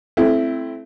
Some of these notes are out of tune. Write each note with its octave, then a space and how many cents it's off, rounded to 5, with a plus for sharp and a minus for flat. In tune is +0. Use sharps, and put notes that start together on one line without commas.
A3 -25 C4 +0 E4 +10